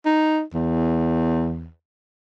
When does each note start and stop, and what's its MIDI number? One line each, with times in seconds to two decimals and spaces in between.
0.06 0.41 63
0.54 1.69 40